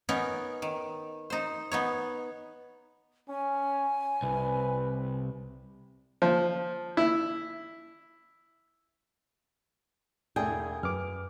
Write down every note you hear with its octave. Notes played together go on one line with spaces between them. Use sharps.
B3 C#4 D#4 A#4 C#5
D#3
D#4 C5
B3 D#4 C#5
C#4 G#5
C2 B4
F3
E4
E1 A3 D4 G#4 G5
F#2 B4 D6 F6